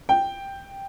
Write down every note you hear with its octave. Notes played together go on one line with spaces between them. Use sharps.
G5